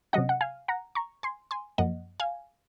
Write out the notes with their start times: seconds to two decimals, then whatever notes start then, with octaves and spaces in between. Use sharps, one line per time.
0.13 C3 F#3 C#4 D#5 F#5
0.29 F#5
0.41 F5 G#5
0.68 F#5 A#5
0.95 A#5 C#6
1.23 G#5 C6
1.51 G#5 C6
1.78 F#2 F3 A#3 D#5 F#5
2.20 F5 G#5